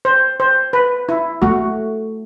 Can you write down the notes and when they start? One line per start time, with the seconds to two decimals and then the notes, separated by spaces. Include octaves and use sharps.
0.05 C5
0.40 C5
0.73 B4
1.09 E4
1.42 A3 F#4